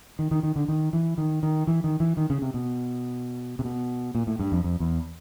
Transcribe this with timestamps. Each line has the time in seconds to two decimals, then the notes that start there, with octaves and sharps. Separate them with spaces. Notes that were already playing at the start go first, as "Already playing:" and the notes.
0.19 D#3
0.31 D#3
0.43 D#3
0.56 D3
0.68 D#3
0.93 E3
1.18 D#3
1.43 D#3
1.67 E3
1.84 D#3
2.00 E3
2.17 D#3
2.30 C#3
2.42 C3
2.54 B2
3.59 C3
3.65 B2
4.15 A#2
4.27 A2
4.40 G2
4.52 F2
4.64 F2
4.80 E2